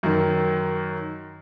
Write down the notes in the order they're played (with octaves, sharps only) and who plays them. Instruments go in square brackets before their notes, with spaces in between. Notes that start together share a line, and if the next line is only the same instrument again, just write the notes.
[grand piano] F#2 D#3